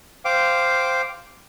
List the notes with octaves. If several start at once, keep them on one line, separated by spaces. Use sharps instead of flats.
C5 F5 G5 D6